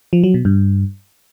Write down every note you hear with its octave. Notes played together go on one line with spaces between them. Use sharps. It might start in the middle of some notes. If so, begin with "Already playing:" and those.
F3
F#3
B2
G2